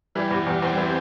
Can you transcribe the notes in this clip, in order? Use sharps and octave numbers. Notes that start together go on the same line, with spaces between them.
E3 G3 G4
E2
E2
E2 C4 C5
E3